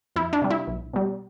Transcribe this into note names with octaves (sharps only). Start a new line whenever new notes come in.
F2 E4
D4
C3 G3
E4
B1
B2 G3